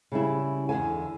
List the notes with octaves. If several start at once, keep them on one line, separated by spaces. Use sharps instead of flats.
C#3 G3 E4
E2 G#2 D3 G#5